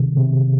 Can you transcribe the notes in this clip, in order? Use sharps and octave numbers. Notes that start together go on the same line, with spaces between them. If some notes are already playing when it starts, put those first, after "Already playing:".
Already playing: C3 D#3
C3